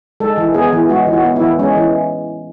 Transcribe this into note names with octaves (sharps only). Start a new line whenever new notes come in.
G#3 A4
E3
B3 G#4
E3
G#3 F#4
E3
F#4
B3
E4
E3
G#3 C#4
E3